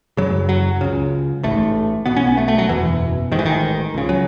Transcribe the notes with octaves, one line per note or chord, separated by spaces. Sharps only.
F#1 F#2 C#3 F#3
F#3
C#2 C#3
A1 G#2 A3
B1 B2 B3
C#4
B3
A3
A3
F#3
F#1 E2 B2 E3
A1 G#2 D#3 E3
D#3
C#2 C#3
F#3